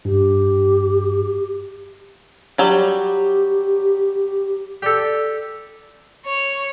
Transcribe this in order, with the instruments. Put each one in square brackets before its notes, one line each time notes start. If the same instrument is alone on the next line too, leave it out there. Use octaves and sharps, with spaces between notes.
[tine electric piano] G2 [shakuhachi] G4
[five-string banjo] F#3 G3 [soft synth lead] G4
[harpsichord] G4 A4 [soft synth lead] D5
[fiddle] C#5